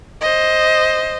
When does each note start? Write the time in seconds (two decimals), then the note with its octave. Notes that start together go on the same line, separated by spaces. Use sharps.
0.21 C5 D#5